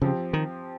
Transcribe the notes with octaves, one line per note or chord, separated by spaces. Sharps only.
C#3 F3 C4 G4
D#3